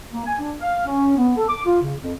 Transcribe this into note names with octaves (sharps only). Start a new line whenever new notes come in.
A#3
G#5
D4
F5
C#4
B3
A4
D6
F4
C#3
F2